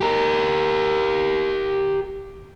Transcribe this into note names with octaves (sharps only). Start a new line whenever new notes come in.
G4 A#4